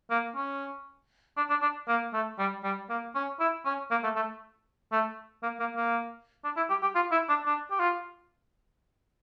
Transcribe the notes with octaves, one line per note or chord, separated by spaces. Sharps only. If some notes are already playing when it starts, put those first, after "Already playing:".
A#3
C#4
D4
D4
D4
A#3
A3
G3
G3
A#3
C#4
E4
C#4
A#3
A3
A3
A3
A#3
A#3
A#3
D4
E4
G4
G4
F4
E4
D4
D4
G4
F4